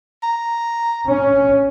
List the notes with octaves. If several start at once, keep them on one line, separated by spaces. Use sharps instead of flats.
A#5
C#4